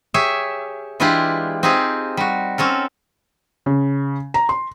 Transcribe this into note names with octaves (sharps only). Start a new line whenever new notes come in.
G4 G#4 C#5 E5
E3 G#3 D4 E4 F4 G4
C4 D#4 F4 G4 G#4
G3 F#4
C4 C#4 A4 A#4
C#3
A#5
C6